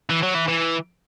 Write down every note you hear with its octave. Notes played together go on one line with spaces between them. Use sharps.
E3
F#3
E3
E3